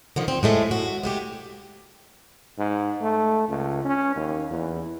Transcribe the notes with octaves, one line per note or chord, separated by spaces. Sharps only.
D3 D#3 F3
C4
A2 G#3 A3
F#4
G#3 A3 G4
G#2
A3
C#2
C#4
D#2
E2